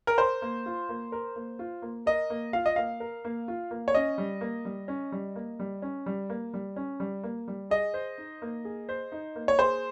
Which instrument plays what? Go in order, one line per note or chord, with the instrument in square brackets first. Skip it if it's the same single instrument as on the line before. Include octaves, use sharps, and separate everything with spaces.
[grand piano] A#4
[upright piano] A#4 [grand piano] C5
[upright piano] A#3
F4
A#3
A#4
A#3
F4
A#3
[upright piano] A#4 [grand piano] D#5
[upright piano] A#3
[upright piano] F4 [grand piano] F5
[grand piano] D#5
[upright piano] A#3 [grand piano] F5
[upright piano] A#4
A#3
F4
A#3
[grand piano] C#5
[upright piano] C#4 [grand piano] D#5
[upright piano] G3
A#3
G3
C#4
G3
A#3
G3
C#4
G3
A#3
G3
C#4
G3
A#3
G3
[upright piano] G#4 [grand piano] D#5
[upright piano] C5
D#4
A#3
G#4
C5
D#4
A#3
[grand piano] C#5
[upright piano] G#4 [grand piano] C5